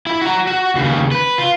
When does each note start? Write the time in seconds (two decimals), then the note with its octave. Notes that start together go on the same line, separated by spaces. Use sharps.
0.06 E4
0.21 F#4 A#5
0.47 F#4
0.75 D#2 C#3
1.11 B4
1.38 F4